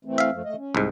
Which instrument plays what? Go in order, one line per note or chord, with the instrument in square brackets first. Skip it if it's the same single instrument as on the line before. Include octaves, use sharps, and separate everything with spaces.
[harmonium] E3 A3 C4
[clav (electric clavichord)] E5 F5
[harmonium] F#2 F3 A3
A3 D#5
C#4
[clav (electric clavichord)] C2 G#2